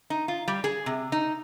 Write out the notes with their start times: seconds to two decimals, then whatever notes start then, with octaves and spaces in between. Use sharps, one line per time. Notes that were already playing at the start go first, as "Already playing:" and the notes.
0.10 D#4
0.28 F4
0.48 G3
0.64 G#4
0.86 C3
1.12 D#4